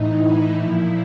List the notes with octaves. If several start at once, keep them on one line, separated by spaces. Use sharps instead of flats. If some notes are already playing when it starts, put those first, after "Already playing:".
Already playing: A2 E3 D#4
E4
A#2 F3